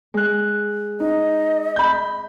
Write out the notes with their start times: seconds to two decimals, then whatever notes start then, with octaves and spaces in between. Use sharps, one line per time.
0.14 G#3 F#6
1.00 D#4 D#5
1.76 B5 G6